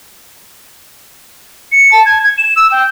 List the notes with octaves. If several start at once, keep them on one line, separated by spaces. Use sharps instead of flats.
C#7
A5
G#6
G#6
E7
E6
G5